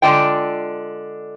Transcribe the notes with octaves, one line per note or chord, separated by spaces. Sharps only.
D3 G#3 D4 F4 G5